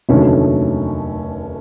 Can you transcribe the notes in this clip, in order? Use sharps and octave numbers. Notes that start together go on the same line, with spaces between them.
F1 D#2 D3 F#3 A3 C#4